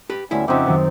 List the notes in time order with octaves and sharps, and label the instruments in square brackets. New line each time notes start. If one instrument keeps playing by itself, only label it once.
[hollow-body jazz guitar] G4 B4
[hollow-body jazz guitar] D2 E4 [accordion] G3 B3 C#4
[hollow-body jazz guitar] F2 C#3 [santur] C4 D#4 [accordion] E5 F#5 D6
[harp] F#2 D#3 G5